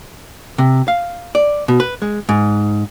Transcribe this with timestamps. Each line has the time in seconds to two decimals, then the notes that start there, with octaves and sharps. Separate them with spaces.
0.58 C3
0.88 F5
1.35 D5
1.68 B2
1.80 B4
2.02 G#3
2.29 G#2